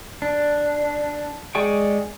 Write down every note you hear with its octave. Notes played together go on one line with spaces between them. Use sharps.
D4
G#3 G#4 D5 G5 C#6